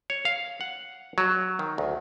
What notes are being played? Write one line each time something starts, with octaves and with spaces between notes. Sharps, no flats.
C#5
F5
F#5
F#3
D#3
D2